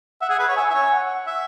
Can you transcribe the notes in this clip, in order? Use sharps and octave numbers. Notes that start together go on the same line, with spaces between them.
E5 F#5
G#4
B4
C#5
E5 G#5
E5
C#5
F#5
E5